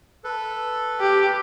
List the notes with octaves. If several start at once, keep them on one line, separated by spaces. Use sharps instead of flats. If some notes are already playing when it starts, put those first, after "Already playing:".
A4 B4
G4